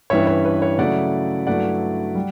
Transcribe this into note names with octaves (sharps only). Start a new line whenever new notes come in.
G2 E3 G3 C#4 E4 C#5 E5
C#5
B4
C#5
C#3 F#3 A3 E4 D5 F#5
G2 F#3 A3 E4 D5 F#5
G3